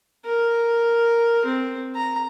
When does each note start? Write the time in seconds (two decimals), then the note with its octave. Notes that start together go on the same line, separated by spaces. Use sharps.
0.25 A#4
1.45 C4
1.95 A#5